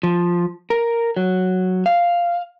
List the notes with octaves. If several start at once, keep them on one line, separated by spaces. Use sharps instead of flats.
F3
A#4
F#3
F5